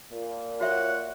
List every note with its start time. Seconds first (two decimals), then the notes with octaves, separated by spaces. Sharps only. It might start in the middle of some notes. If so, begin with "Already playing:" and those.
0.10 A#2
0.61 F#4 C#5 E5 F#5 C#6